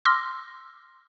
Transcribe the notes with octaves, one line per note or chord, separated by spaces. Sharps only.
C6 D6 E6 F6 A#6